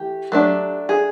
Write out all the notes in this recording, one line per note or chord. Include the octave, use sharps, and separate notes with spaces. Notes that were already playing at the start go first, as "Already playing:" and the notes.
Already playing: E3 A3 G4
F#3 A3 D4
G#4